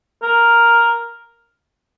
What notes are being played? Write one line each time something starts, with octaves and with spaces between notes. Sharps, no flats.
A#4